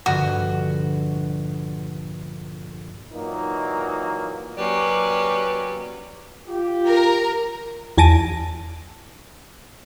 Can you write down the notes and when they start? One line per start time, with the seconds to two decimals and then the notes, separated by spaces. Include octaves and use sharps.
0.06 A#1 G2 D3 F#4
3.12 A#2 E3 F#3 A#3 D#4
4.58 F#3 A#3 C#4 G4 B4 D5
6.48 F4 G4
6.88 A#4
7.98 E2 G#5 A5 A#6 D7 D#7